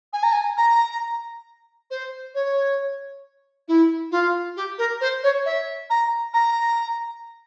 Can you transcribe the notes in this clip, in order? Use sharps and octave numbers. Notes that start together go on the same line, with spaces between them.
G#5
A#5
G#5
A#5
C5
C#5
E4
F4
G4
A#4
C5
C#5
E5
A#5
A#5